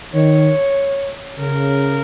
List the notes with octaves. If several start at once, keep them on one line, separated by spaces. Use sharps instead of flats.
D#3 C#5
C#3 A#4